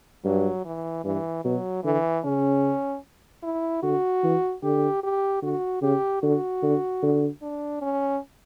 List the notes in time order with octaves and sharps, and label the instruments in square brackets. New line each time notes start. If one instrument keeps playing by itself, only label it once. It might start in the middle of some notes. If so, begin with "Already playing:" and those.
[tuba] G2 [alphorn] F#3
[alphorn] E3
[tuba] G2 [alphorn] E3
[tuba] B2 [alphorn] F#3
[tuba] D3 [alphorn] E3
[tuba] C#3 [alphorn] C#4
[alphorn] E4
[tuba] D3 [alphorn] F#4
[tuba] E3
[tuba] D3 [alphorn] G4
[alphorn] G4
[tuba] D3 [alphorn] F#4
[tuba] C#3 [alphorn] G4
[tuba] D3 [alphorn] F#4
[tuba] D3
D3
[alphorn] D4
C#4